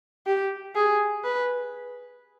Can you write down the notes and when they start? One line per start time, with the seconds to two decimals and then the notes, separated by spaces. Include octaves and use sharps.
0.26 G4
0.75 G#4
1.24 B4